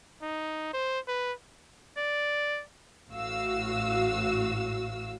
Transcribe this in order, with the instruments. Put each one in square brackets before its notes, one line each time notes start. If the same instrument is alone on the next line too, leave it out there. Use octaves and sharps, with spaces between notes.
[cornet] D#4
C5
B4
[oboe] D5
[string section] A1 A2 F#4 F5 E6